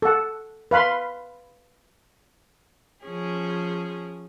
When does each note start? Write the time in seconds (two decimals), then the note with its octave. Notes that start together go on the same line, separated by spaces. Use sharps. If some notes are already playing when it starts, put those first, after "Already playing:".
0.02 A4 F#5
0.71 B4 F5 B5 C6
3.05 F3 C#4 G#4